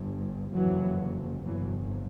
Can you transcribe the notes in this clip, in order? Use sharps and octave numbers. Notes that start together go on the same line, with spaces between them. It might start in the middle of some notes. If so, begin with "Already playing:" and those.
Already playing: G1 G2
F#1 F2 C3 E3 F#3
G1 F2 C3 E3 F#3